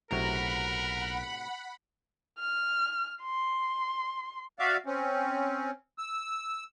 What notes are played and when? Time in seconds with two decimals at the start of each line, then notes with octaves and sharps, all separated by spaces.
0.11 B1 A2 C3 F#4 A#4 F#5 A#5 B5
2.39 F6
3.22 C6
4.59 F#4 D5 E5 F5
4.86 C4 C#4
5.98 E6